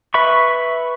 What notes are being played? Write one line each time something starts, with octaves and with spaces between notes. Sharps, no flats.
B4 E5 B5 C#6